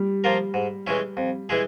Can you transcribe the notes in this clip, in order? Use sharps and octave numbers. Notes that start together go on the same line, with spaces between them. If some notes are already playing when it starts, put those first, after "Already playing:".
Already playing: G3
F3 A#3 F4 A#4
G#2
E3 G#3 C#4 E4
F2
E3 G#3 E4 G#4